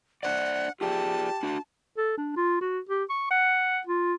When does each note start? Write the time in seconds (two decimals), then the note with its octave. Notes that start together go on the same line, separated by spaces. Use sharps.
0.23 D4 C5 D5 F#5
0.81 F4 G4 G#4 D5 A5
1.43 D4 F#4
1.97 A4
2.17 D4
2.36 F4
2.61 F#4
2.89 G4
3.10 C#6
3.31 F#5
3.87 F4